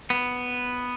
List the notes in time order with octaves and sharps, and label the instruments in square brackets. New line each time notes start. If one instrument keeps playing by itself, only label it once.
[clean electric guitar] B3